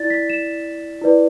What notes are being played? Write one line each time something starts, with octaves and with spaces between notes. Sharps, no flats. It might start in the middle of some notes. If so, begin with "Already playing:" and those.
Already playing: E4 D5 A6
B6
E7
E4 B4 D5